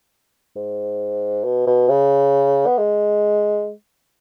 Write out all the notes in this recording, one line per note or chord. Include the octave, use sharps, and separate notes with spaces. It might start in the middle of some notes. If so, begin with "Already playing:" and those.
G#2
B2
B2
C#3
B3
G#3